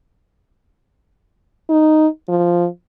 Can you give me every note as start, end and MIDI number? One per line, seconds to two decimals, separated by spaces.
1.69 2.07 63
2.29 2.67 53